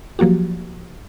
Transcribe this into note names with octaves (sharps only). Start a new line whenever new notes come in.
F3 F#3 A#3 F#4 G4